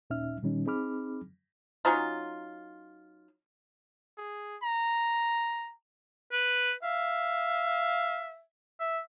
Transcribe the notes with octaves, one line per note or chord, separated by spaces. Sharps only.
D#2 A#2 C#4 D#4 E5 F6
A#2 D#3 G3 C#4 D#4
C4 D#4 G#4 B5 D6 F6
F#3 C#4 D#4 F4
G#4
A#5
B4
E5 F5
E5